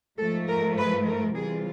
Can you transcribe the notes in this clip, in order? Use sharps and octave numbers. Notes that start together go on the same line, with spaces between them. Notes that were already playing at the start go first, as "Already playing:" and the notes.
G#2 F3 A3 A4
A#4
B4
A#4
C3 E3 G3 C4 F4 G#4